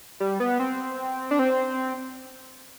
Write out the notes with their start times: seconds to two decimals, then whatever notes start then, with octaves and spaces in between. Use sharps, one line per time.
0.20 G3
0.40 B3
0.60 C4
1.31 D4
1.39 C4